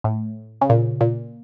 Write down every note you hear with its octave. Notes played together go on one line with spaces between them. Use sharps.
A2
C#3
A#2
A#2